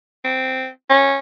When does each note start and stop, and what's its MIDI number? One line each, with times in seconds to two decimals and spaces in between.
0.24 0.68 60
0.90 1.18 61